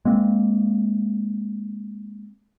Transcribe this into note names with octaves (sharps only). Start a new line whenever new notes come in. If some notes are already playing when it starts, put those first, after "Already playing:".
G#3 A#3 C4